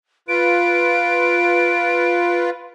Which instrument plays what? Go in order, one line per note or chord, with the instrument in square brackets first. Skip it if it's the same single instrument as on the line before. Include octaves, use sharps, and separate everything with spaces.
[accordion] F4 B4 [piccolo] D7